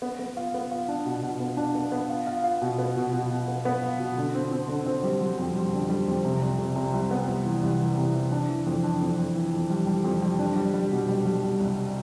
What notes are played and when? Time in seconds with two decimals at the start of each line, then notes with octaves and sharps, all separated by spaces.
0.02 B3
0.19 B3
0.37 F4
0.54 B3
0.71 F4
0.88 D4
1.06 B2
1.23 B2
1.40 B3
1.57 D4
1.75 B3
1.92 B3
2.09 F4
2.27 F4
2.44 F4
2.62 B2
2.78 B3
2.96 B2
3.13 B2
3.30 B2
3.48 B3
3.65 B3
3.82 F4
3.99 B2
4.17 D3
4.34 C4
4.51 C4
4.68 D3
4.86 C4
5.03 G3
5.21 G3
5.38 F2
5.55 G3
5.73 D3
5.90 G3
6.07 F2
6.25 C3
6.42 C2
6.59 C3
6.76 C3
6.93 C2
7.11 B3
7.28 C2
7.45 E3
7.63 C2
7.79 E3
7.97 C3
8.14 E3
8.32 D4
8.49 E3
8.66 F2
8.83 D4
9.01 F2
9.18 F2
9.35 E3
9.53 F2
9.70 G3
9.87 G3
10.04 F2
10.22 G3
10.39 D4
10.56 G3
10.74 G3
10.91 B2
11.08 G3
11.25 G3
11.43 G3
11.60 C2